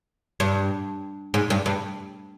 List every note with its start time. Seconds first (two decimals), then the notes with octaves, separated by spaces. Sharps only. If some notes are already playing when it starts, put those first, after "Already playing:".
0.40 G2
1.34 G#2
1.50 G2
1.66 G2